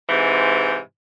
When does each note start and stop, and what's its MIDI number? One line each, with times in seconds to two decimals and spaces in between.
0.09 0.77 44
0.09 0.77 48
0.09 0.77 52